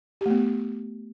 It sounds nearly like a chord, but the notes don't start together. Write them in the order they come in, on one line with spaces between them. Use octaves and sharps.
G4 A3 B3